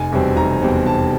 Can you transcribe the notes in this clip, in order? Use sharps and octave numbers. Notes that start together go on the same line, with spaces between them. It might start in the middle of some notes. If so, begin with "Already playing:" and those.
Already playing: F1 G#5
E2 B2 G3 C4
F1 A#5
E2 B2 G3 C4
F1 A5